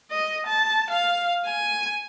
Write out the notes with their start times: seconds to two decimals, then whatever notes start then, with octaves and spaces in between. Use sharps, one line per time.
0.11 D#5
0.47 A5
0.90 F5
1.46 G#5